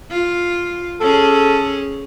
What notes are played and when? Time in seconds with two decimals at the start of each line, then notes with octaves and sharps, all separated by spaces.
0.11 F4
1.01 C#4 G#4 A4